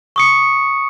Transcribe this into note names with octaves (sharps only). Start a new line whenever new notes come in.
C#6 D#6 C#7